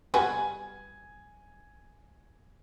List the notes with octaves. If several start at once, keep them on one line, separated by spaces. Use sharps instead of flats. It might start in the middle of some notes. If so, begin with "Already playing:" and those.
G3 F#4 B4 G#5